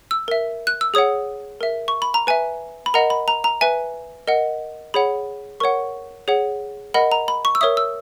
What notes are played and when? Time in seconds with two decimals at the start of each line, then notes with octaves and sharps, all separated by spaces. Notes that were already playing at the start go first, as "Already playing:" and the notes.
0.11 E6
0.28 A#4 E5
0.67 F#6
0.81 E6
0.94 G#4 C#5 F#5 D#6
1.61 A#4 E5
1.88 C#6
2.02 B5
2.14 A#5
2.27 B4 E5 G#5
2.86 B5
2.94 A#4 D#5 F#5 A#5
3.10 B5
3.28 A#5
3.44 A#5
3.61 B4 E5 G#5
4.28 A#4 D#5 F#5
4.94 G#4 C#5 F#5 B5
5.60 A#4 C#5 F#5 C#6
6.28 G#4 C#5 F#5
6.94 A#4 D#5 F#5 B5
7.12 A#5
7.28 B5
7.45 C#6
7.55 E6
7.61 A#4 C#5 E5 D#6
7.77 E6